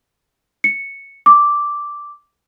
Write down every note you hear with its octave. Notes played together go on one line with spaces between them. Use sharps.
C#7
D6